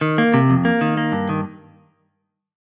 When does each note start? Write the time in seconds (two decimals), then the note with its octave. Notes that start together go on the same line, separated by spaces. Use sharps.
0.01 D#3
0.18 A#3
0.34 C3
0.50 F2
0.65 A#3
0.81 D#3
0.97 A#3
1.12 G2
1.29 D#3